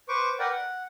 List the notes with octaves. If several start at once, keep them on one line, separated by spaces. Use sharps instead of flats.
B4 C5 C#6 D6
A#4 B4 D5 F#5 G5
F#5